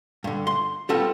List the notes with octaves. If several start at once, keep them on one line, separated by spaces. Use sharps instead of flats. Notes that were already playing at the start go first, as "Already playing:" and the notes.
G2 D3
C6
G3 B3 C4 F4 A4